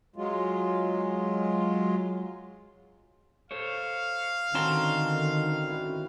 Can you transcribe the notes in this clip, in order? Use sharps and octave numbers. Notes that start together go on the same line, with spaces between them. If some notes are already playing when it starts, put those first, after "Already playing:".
F#3 G#3 F4
A4 C5 C#5 F5
D3 D#3 C4 C#4 D#4 F#4 A5 C6
E4 F#4